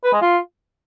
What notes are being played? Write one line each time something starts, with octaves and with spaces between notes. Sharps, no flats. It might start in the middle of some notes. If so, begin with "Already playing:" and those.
B4
G#3
F4